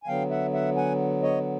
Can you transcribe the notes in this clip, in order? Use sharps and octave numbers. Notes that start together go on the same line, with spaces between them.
G#5
D3 F#3 B3 F5 G5
E5 F#5
E5 F#5
F#5 G#5
C#5 D#5